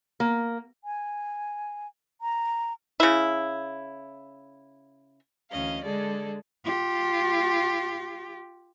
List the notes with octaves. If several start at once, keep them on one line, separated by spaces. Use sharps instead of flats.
A#3
G#5
A#5
C#3 E4
D2 E3 C#4 D#5 F5
D3 G#3 G#4 A4 D5
F4 G4